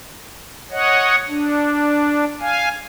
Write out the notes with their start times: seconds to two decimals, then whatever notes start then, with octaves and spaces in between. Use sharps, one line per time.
0.71 C#5 D#5 F#5
1.28 D4
2.40 F5 G#5